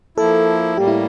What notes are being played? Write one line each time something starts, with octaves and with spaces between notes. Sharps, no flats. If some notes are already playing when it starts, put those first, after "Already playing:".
F3 A#3 E4 A4
A2 G3 A#3 G4
E4